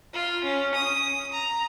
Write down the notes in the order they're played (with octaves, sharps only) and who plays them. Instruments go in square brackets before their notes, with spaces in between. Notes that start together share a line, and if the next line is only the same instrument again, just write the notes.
[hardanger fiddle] F4
C#4
D#6
A#5